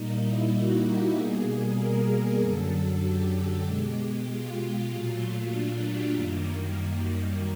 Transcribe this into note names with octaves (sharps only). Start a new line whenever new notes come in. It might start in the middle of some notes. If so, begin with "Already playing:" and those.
Already playing: A#2 G3 A#3 D#4
E4
F#4
G4
B2 G3 A#3 G#4
A#4
A#4
F#2 D3 F#3 A4
G4
B2 G#3
F4
A#2 F#3 A3
D4
G4
F#2 D#3 G3 A#3